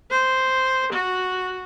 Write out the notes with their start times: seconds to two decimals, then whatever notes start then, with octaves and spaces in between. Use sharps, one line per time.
0.11 C5
0.93 F#4